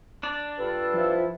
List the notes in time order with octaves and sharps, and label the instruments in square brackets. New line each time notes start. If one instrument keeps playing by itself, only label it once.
[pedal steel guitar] D4 D5
[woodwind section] G2 F4 A4 [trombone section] B4
[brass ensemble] F3 E4